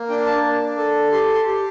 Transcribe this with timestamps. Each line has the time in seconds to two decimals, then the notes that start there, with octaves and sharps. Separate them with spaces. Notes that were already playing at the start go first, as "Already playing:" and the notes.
Already playing: A#3
0.09 D4 G5
0.26 A5
0.44 D4
0.78 A4
1.12 G4 C6
1.34 C6
1.46 G4